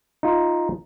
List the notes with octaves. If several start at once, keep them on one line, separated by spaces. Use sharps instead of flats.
D#4 F4